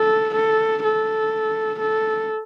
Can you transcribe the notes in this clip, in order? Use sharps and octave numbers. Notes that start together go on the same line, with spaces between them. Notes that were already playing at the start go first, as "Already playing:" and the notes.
Already playing: A4
A4
A4
A4